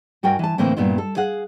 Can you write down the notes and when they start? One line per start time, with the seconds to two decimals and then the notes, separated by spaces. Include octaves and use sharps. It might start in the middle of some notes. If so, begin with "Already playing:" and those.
0.23 G2 F#4 A#4 G5 G#5
0.39 E3 A5
0.58 A2 D3 E3 A#3 C4 E4
0.77 G2 A#2 B3 E4 F4
0.98 A4
1.17 G#4 F5 F#5